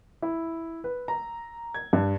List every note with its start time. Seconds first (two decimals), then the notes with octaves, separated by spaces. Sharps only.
0.22 E4
0.84 B4
1.08 A#5
1.74 G#6
1.93 G2